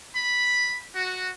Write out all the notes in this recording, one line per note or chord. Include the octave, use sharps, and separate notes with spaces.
B5
F#4